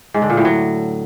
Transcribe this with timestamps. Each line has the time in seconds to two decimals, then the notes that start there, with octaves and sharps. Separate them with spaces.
0.14 G#2
0.22 D3
0.30 A#2
0.37 A2
0.45 F#3